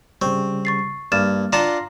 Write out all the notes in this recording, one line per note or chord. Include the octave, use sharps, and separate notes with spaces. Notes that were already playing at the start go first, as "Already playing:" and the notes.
C#3 G3 C4 C#6
C#6 A6 C7
G2 A#3 F6 A6 E7
D4 F4 F5 F#5 A#5 C6 A#6 E7